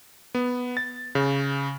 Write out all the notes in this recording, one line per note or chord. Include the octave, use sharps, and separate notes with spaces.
B3
A6
C#3